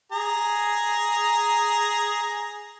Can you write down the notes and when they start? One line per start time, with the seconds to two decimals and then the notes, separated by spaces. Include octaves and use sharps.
0.12 G#4 A#5